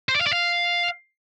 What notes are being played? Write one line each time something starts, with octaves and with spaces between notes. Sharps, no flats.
C5
D5
F5
D5
F5